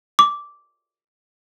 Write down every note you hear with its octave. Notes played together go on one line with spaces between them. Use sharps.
D6